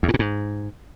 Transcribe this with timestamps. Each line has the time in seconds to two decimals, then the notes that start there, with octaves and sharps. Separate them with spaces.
0.03 E2
0.08 G#2
0.14 A#2
0.19 G#2